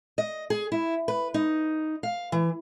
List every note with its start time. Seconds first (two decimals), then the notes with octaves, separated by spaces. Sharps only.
0.18 D#5
0.50 G#4
0.72 E4
1.08 B4
1.34 D#4
2.03 F5
2.32 E3